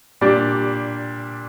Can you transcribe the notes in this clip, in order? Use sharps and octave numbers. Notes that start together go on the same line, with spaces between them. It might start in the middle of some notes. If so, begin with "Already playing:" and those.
A#2 G3 D4 G4 D5